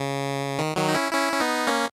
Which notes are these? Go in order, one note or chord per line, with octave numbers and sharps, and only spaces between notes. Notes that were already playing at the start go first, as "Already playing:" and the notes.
Already playing: C#3
D#3
D#3 F#3
D#4
C#4 E4
C#4 E4
C#4
B3 D#4
A#3 C#4